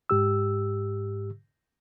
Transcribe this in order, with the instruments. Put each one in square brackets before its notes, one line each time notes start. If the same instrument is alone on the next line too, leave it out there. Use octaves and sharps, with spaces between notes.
[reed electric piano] G#2 G4 E6